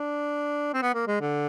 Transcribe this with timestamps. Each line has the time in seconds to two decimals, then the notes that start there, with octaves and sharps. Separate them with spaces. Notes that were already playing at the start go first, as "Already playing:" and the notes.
Already playing: D4
0.73 C4
0.82 B3
0.94 A#3
1.07 G#3
1.21 D3